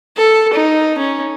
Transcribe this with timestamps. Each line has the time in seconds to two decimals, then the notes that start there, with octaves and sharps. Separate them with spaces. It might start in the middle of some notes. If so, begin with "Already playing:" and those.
0.17 A4
0.53 D#4
0.98 C#4